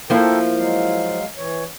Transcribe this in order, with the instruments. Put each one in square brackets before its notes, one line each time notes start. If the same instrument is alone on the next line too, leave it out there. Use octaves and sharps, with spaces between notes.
[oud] F3 A#3 E4 [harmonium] A4 A#4 G5
[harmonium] F#3 G#3 F5
E3 C#5